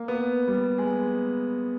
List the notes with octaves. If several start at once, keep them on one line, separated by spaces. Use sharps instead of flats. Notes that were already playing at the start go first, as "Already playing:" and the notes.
Already playing: A#3
B3
G3
G#3